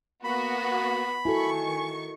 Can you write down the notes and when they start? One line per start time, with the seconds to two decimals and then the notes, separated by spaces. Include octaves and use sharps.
0.24 A#3 B3 F#4 B5
1.25 D#3 E4 F#4 A4 G#5 C#6